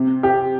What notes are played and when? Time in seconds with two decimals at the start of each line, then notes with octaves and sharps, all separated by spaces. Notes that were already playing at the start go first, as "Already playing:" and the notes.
Already playing: C3
0.23 G4